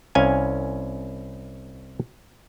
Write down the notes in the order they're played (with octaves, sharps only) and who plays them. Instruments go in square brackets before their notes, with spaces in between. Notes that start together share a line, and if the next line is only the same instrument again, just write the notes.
[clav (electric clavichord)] C2 C#4 F5 G#5